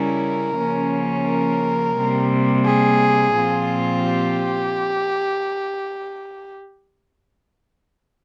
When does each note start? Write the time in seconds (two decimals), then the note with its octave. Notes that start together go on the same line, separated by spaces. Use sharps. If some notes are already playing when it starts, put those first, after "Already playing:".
Already playing: C#3 G3 C#4 E4 A#4
0.58 C#3 F3 A#3 C#4
1.27 A#4
1.96 C3 G3 A#3
2.65 G#4
3.34 A#2 F3 C4 F4
4.04 G4